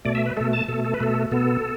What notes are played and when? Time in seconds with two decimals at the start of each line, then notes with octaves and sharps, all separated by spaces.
0.05 B2 A3 D5
0.15 E5
0.26 B4
0.37 B2 A3 A4
0.53 A5
0.68 B2 A3 A4
0.85 A4
0.94 B4
1.00 B2 A3 A4
1.32 B2 B3 A4